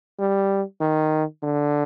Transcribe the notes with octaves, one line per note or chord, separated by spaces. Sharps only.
G3
D#3
D3